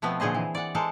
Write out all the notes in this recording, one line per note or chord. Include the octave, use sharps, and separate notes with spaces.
B2 F3 A3 B3 C4
A#2 D3 G#4 C5 D#5
E3
D5 F#5
G#3 A4 A#4 C5 A5